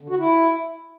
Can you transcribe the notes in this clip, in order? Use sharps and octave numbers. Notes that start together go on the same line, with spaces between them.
D3
F#4
E4